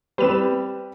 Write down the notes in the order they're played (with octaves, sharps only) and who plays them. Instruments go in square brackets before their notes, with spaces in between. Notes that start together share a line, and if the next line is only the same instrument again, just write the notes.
[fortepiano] G3 C4 [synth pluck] B4 E7